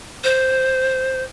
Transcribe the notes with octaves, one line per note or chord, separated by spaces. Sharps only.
C5